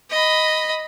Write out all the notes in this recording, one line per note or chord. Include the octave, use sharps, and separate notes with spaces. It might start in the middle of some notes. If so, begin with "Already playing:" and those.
D#5 B5